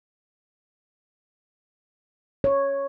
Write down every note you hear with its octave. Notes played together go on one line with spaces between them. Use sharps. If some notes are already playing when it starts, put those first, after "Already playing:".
C#5